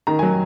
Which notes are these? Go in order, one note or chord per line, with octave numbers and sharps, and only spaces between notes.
D#3 A#5
F#3 G#5